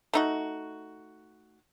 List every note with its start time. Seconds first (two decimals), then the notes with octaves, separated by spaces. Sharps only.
0.13 A3 D#4 F#4